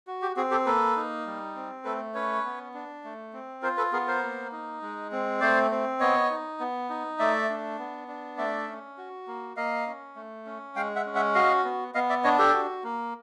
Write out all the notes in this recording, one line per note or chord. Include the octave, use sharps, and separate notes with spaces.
F#4
G4
C4 F#4 G#4
G4 A4
A#3 A4 B4
D#4
G3
C4
A3 A4 B4
C#4 B4 C#5
B3
D4
A3
C4
F4 A#4 C5
A4 B4
B3 G#4 A#4
A#4 C5
A#3
D#4
G#3
C4
A3 C5 D5
C4
B3 C#5 D#5
D#4
B3
D#4
A3 D5 E5
D4
B3
D4
A3 D5 E5
C#4
F#4
A#3
A#3 D#5 F5
C#4
A3
C#4
G#3 F5 G5
E5 F#5
C#4
E5 F#5
F#4 D#5 F5
B3
B3 D#5 F5
D5 E5
D4 C#5 D#5
G4 A4
F#4
A#3